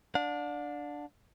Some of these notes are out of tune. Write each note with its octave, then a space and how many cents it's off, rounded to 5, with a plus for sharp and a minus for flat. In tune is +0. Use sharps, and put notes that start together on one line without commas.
D4 +0 F#5 -45